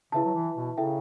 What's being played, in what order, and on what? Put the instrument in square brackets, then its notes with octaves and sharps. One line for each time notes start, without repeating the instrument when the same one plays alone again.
[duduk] C#3 [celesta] E4 B4 E5 A5
[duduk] F#3
E3
B2
[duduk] C#3 [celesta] E4 A4 E5 G5